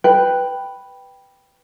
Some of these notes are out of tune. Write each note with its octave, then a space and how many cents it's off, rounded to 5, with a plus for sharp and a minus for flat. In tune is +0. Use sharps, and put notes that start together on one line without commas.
B4 +0 G5 +0